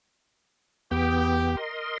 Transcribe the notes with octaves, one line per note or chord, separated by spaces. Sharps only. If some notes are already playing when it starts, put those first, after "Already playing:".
E2 B3 G4 G5
A#4 D#5 C6